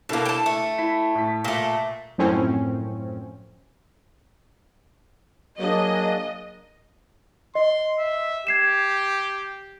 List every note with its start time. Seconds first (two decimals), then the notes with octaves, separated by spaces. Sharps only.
0.09 B2 A#3 D4 E4 A4
0.25 G5 A5
0.46 A3
0.78 E4 B6
1.15 A2 B6
1.44 A#2 A3 B6
2.18 F#2 A2 F3 C4 C#4
5.60 F#3 A#3 D4 G#4 D#5
7.55 D#5 C6
7.99 E5
8.47 G4 G#6 C7 E7